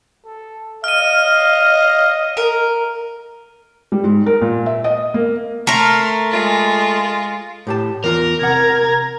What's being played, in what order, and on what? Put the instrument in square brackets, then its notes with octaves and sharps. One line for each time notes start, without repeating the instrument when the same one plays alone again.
[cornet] A4
[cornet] D#5 [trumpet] F5 [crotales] F6 D#7
[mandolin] A#4
[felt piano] G3
G#2
A#4
A#2
E5
D#5
A#3
[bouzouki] A3 A#4 A#5 [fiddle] C6
[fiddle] G#3 F4
[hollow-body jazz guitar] A2 G4 A5
[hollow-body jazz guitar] E2 F4 A#5 [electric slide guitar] A#4
[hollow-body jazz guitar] C3 F#5 [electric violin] A#5 G#6